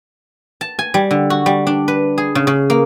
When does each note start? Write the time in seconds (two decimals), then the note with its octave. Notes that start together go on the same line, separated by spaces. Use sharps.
0.61 A5
0.79 G#5
0.94 G3
1.11 D3
1.30 F#4
1.46 G3
1.67 D4
1.88 B4
2.18 G#4
2.35 C#3
2.47 C#3
2.70 A#3